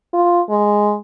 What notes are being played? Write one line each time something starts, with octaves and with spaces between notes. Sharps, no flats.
F4
G#3